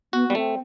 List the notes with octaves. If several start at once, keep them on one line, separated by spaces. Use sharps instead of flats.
B3 F#4
G3 B3
A3 C4